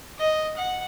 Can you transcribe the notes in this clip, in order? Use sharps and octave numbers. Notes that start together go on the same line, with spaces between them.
D#5
F#5